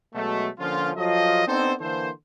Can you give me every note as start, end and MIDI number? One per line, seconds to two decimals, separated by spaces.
0.14 0.48 47
0.14 0.48 54
0.14 0.48 56
0.14 0.48 57
0.59 0.91 50
0.59 0.91 53
0.59 0.91 58
0.59 0.91 61
0.59 0.91 65
0.96 1.45 53
0.96 1.45 54
0.96 1.45 65
0.96 1.45 69
0.96 1.45 75
1.47 1.74 59
1.47 1.74 60
1.47 1.74 62
1.47 1.74 63
1.47 1.74 69
1.47 1.74 72
1.80 2.10 50
1.80 2.10 52
1.80 2.10 58
1.80 2.10 69
1.80 2.10 72